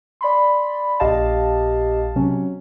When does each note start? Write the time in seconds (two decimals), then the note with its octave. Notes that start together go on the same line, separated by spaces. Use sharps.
0.21 D5 B5 C6
1.00 A#1 G4 D#5 F5 A5
2.16 C3 F#3 C#4